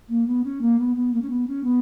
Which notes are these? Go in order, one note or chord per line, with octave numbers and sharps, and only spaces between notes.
A#3
B3
C#4
A#3
B3
B3
A#3
C#4
B3
C#4
B3